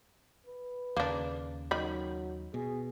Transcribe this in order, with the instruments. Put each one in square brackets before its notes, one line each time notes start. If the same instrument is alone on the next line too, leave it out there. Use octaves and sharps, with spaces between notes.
[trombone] B4
[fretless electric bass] D#2 C#3 [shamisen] A#3 D4
[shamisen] D#3 B5 [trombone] F#3
[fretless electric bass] B2 [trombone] G#4